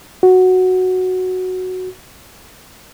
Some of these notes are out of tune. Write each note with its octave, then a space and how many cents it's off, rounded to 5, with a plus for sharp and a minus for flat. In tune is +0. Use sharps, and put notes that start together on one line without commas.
F#4 +0